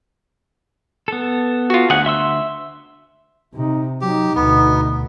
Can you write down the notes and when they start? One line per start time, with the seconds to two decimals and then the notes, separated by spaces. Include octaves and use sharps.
1.08 B3 A4
1.70 F4 F#4
1.90 D2 G#4 F#5
2.06 E5 C6 E6
3.54 C3 D#4
4.01 F#3 D#4 G4
4.35 D2 B2 B3